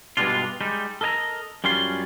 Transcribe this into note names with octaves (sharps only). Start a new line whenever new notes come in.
G2 B2 G3 G#3 D4 F4
G3 G#3 D#4
A4 A#4 D#5 G#5 A#5
F#2 G3 C#4 F4 C6